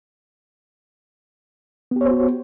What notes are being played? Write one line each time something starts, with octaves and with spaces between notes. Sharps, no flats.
B3 F#4 G4 C5 C#5